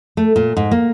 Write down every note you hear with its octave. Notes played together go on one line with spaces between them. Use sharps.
A3
A#2
G#2
A#3